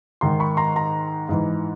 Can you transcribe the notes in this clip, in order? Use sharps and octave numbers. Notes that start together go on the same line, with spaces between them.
G#2 D#3 A#5 C6
B5 C#6
A#5 C6
A#5 C6
G#2 E3